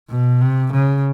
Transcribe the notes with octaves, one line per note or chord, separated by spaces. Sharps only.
B2
C3
C#3